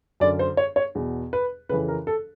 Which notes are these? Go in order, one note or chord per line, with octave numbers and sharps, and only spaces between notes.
F#2 D3 D5
C5
C#5
C#5
E2 B2
B4
F2 C#3 E3 B4
A#4
A4